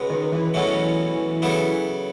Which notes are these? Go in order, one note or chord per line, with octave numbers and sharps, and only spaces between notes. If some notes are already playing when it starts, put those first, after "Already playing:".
Already playing: C#2 B2 G#3 B3
D#3
E3
E2 B2 E3 F#3 A3 C#4
C#3 F#3 B3 E4 A4